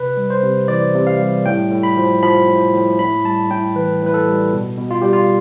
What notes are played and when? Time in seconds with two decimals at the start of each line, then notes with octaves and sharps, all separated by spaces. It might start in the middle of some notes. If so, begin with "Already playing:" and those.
Already playing: C3 B4
0.17 G3
0.30 C5
0.43 C3
0.68 E3 D5
0.94 C3
1.07 F5
1.20 G3
1.46 A2 G5
1.71 A2
1.83 B5
1.97 F3
2.23 F3 B5
2.48 A2
2.74 A2
2.99 A2 B5
3.25 G3 A5
3.51 A2 G5
3.75 E3 B4
4.02 A2 B4
4.14 A4
4.27 G3
4.53 B2
4.78 B2
4.91 F4
5.02 G3 G4
5.13 F4